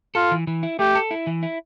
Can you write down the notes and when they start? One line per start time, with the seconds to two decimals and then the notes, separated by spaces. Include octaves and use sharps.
0.15 F4 A4
0.31 E3
0.47 E3
0.63 E4
0.79 A3 G4
0.95 A4
1.11 E4
1.27 E3
1.43 E4